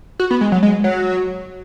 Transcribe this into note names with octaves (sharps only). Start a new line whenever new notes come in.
F#4
B3
G#3
F#3
G#3
F#3